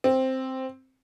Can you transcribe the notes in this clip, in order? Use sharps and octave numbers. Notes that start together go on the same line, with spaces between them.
C4